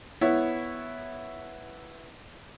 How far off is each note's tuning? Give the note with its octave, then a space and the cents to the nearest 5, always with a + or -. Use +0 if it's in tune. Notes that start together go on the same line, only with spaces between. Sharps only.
B3 +0 E4 +0 C#5 +0